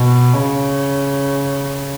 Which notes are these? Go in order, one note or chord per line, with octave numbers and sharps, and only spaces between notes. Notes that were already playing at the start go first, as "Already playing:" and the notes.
Already playing: B2
C#3